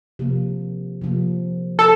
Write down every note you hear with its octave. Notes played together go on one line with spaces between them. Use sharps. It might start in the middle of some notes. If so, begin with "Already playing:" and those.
C3 F3 A#3
C3 F3 A#3
A4